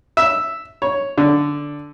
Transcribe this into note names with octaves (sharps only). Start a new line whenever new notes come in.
E5
C#5
D3